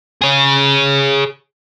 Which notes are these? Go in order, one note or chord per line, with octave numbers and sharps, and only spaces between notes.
G#4 C#5